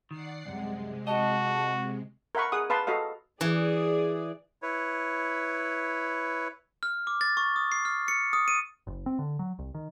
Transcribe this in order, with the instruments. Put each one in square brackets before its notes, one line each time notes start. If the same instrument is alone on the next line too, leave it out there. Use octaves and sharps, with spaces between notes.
[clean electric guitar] D#3 [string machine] D5 F#5 C7
[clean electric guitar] C2 F#2 [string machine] C3 G#3
[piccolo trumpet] F#4 [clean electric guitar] D#5 [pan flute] A5
[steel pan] A#4 E5 F#5 B5 C#6
G#4 F#5 D#6
B4 F5 A5 B5 C6
F#4 A4 D#5 F5
[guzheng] E3 [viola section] G#4 D5
[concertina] E4 B4 C#5
[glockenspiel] F6
D6
A6
C#6
D#6
C7
F6
C#7
D#6
D#7
[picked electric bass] F#1
C4
D3
F#3
C2
D#3